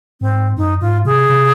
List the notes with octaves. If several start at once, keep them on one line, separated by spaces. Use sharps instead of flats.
G#2 C4
F#2 D#4
G#2 F4
C3 G#4
C3